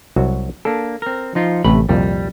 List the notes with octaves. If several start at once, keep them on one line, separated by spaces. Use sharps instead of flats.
C2 F#3 F#4
A#3 D4 A4 A5
C4 A#4
F3 D#4 F4
A1 C3 A3 B5
C2 F2 A#2 G3